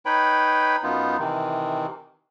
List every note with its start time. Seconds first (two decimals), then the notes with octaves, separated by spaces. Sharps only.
0.06 D#4 B4 C#5 G5 B5
0.83 F#2 B3 D#4 F4
1.19 C3 D#3 E3